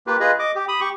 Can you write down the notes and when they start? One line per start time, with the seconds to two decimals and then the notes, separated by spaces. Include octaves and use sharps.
0.07 A#3 F4 G4 B4
0.20 F4 G#4 B4 D#5
0.39 D#5 D6
0.55 G4
0.68 B5 D#6
0.80 G4 C#6